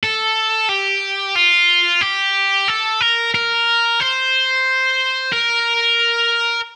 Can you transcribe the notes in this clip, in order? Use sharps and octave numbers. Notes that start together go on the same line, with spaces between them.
A4
G4
F4
G4
A4
A#4
A#4
C5
A#4